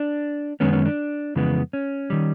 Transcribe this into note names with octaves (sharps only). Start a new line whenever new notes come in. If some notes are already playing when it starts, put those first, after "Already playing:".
Already playing: D4
F#2 D#3 G#3 B3 C#4
C#4
D4
F2 C#3 E3 G#3 B3
C#4
D#3 G3